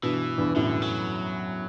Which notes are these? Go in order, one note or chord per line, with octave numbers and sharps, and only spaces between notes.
G2 B2 E3
E2 G2
F#2 A2 D3
F#3